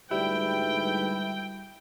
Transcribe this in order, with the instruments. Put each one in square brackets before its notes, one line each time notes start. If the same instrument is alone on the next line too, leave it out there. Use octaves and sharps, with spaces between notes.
[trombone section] D2 G#2 B4 [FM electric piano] G3 [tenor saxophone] E4 [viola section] G5